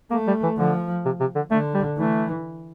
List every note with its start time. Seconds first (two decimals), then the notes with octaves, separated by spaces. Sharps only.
0.11 A3 A#3
0.27 G3
0.43 E3
0.58 D3 F3
1.05 C3
1.20 C3
1.35 D3
1.51 D3 A3
1.74 G3
1.97 E3 A3